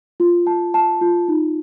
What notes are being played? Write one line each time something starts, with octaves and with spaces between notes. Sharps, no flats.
F4
A5
A5
F4
D#4